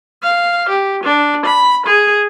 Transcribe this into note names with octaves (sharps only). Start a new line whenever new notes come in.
F5
G4
D4
B5
G#4